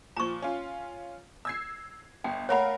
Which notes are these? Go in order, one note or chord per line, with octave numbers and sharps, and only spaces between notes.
A#2 F3 A#5 C#6
C#4 F4
E6 G#6 C7
G1 G5
A3 A#4 C#5 F5 F#5 B5